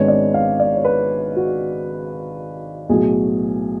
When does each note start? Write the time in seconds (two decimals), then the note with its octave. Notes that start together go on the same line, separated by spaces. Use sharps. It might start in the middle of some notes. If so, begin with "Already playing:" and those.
Already playing: G#1 G#2 G#3 B3 D4 C#5
0.08 D5
0.34 F5
0.59 D5
0.76 C#5
0.85 B4
1.36 F#4
2.89 B1 A2 F#3 G#4